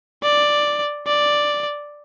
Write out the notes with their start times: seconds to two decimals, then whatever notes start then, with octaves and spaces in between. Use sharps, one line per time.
0.23 D5
1.07 D5